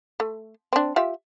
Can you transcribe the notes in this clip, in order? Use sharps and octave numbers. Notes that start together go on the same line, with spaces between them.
A3
C4 D4
F4 G4 E5